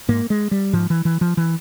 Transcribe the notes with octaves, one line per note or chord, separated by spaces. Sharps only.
G#2 A#3
G#3
G3
G#2 F3
E3
E3
F3
E3